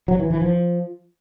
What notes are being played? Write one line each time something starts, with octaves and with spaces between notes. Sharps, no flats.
F#3
E3
E3
F3